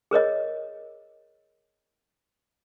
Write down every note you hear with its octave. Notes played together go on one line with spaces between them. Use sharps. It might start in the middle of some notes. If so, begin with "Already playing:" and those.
G#4 A#4 C#5 D#5